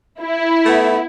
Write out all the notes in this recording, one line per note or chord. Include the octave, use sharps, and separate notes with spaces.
E4
A3 B3